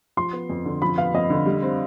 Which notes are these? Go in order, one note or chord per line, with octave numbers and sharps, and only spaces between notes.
F3 C6
B3
F2
D3
F3 B5
B3 F5
F2 D#5
D3
G3
C4